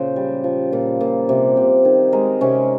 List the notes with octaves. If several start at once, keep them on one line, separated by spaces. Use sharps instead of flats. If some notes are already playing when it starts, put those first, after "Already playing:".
Already playing: A#2 C#3 C5
G3
F3
A#2
A#2
C3
C3
D#3
G#3 A#4
C3 C#4